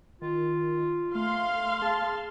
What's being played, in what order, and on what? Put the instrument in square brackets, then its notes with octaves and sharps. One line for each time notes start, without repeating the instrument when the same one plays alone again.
[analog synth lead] D#3 [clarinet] F4
[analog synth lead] A3 [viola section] F5 C6
[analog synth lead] G#4 [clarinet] A5